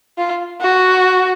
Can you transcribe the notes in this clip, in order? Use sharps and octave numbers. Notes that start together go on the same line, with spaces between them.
F4
F#4